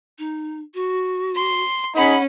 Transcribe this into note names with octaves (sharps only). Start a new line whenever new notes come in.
D#4
F#4
C6
C#4 D#4 G#4 F#5 B5